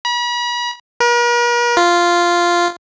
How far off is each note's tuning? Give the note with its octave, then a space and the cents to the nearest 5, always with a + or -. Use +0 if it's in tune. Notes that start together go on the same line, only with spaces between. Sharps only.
B5 -40
A#4 +45
F4 -5